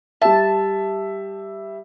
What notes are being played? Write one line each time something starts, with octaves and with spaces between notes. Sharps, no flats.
G3 E5 A5